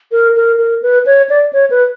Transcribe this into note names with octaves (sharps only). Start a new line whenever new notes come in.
A#4
A#4
A#4
B4
C#5
D5
C#5
B4